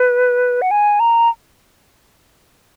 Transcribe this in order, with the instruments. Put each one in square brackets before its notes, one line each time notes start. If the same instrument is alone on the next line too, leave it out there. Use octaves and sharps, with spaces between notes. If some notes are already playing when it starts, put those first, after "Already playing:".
Already playing: [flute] B4
F#5
G#5
A#5